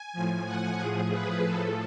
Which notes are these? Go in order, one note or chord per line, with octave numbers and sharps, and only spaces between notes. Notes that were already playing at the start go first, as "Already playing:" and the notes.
Already playing: G#5
A2 F3
F#5
A2 F3 G#4
B4
A2 F3 A4